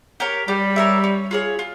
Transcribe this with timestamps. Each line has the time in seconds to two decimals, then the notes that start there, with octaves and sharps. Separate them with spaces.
0.20 G4 A#4 C#5
0.48 G3 G4
0.76 A#4 C#5 E5
1.04 C#4
1.31 F4 G#4 C#5
1.59 F4